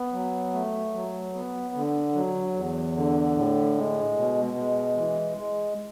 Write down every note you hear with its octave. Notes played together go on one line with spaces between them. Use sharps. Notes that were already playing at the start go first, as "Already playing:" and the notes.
Already playing: B3
F#3
A3
F#3
B3
D3
F#3
E2
D3
A2
G#3
B2
G#3
E3
G#3